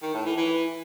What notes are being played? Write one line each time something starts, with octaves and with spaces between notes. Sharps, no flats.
D#3
A2
E3
E3